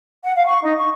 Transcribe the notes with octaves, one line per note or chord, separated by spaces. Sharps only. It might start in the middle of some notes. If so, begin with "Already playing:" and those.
F#5
F5
C#6
D#4
C#6